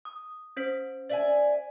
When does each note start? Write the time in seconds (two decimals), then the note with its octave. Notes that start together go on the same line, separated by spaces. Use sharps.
0.05 D#6
0.57 C#4 C5 B6
1.09 D5 E5 G#5